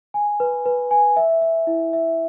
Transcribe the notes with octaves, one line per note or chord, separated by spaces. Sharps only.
G#5
B4
B4
G#5
E5
E5
E4
E5